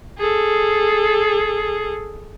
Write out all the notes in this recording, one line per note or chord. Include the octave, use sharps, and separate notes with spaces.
G#4 A4